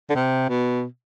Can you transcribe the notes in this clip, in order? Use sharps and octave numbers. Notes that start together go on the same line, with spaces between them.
D3
C3
B2